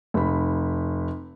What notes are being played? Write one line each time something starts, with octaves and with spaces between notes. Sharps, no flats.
F1 B5